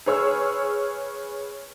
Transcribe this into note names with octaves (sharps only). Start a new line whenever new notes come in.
G#4 B4 C#5 C#6 E6 F6